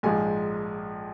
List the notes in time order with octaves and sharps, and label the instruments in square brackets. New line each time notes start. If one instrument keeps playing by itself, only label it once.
[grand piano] A#1 G#2 F3 G#3 G#5